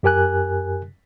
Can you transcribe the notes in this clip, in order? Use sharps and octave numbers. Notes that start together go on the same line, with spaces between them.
F#2 G4 A#4 G#5 F#6